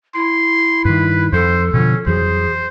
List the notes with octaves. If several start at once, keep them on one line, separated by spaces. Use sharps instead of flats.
E4 C6
G2 D#3 B4
F2 A4 C5
B2 D3 F3 C#4
F2 E3 F#3 G#4 C5